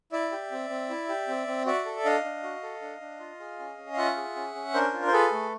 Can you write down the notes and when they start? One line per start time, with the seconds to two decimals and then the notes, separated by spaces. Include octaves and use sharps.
0.12 E4 D5 E5
0.32 G4
0.52 C4
0.70 C4
0.90 E4
1.09 G4
1.28 C4
1.47 C4
1.66 F#4 D5 E5
1.86 A4
2.05 D4 D#5 F5
2.24 D4
2.43 F#4
2.63 A4
2.82 D4
3.01 D4
3.20 F4
3.40 G#4
3.59 C#4
3.78 C#4
3.93 F5
3.97 F4 E5 F#5
4.17 G#4
4.36 C#4
4.55 C#4
4.74 D4 A#4 C5
4.93 F4
5.07 C5
5.13 G#4 A4 B4
5.32 A3